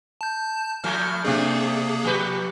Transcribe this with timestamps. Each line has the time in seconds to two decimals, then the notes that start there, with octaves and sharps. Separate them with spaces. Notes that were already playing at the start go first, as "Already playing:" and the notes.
0.21 A5 G6
0.84 A2 F3 A3 F6
1.25 C3 A3 A#3 C4 D4 G#4
2.04 F3 G4 B4